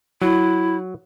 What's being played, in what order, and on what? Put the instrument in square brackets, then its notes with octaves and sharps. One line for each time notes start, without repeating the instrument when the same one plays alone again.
[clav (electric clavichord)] F#3 [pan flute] E4